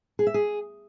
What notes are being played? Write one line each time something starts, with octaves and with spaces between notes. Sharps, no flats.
G#4
E5
G#4